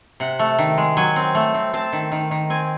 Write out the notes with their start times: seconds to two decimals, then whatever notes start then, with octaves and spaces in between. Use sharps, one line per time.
0.20 C3 F#5
0.39 A3
0.58 D#3
0.78 G#3
0.97 F#3 G#5
1.16 C4
1.35 A3
1.55 C4
1.73 C4 A5
1.93 D#3
2.12 D#3
2.31 D#3
2.50 C4 G#5